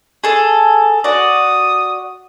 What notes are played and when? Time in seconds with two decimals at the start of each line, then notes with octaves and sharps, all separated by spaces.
0.24 G#4 A4
1.04 F#4 D5 D#6